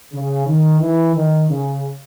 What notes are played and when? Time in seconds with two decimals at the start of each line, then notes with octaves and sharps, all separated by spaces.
0.13 C#3
0.46 D#3
0.80 E3
1.15 D#3
1.49 C#3